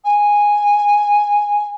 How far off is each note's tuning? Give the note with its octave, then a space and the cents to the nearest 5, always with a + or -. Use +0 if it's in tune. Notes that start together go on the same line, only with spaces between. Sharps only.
G#5 -5